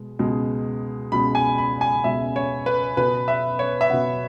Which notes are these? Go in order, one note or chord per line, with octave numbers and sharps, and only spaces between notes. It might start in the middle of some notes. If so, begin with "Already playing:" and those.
Already playing: B2 G#3
C#2 B2 G#3
C#2 B2 G#3 B5
G#5
B5
G#5
C#2 B2 G#3 E5
C#5
B4
B2 B3 B4
E5
C#5
E5
B2 B3 F#5